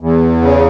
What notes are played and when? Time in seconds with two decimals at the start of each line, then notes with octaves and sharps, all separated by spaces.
0.01 E2
0.42 C#3